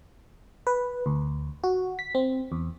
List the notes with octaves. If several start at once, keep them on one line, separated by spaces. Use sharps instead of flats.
B4
D2
F#4
B6
C4
E2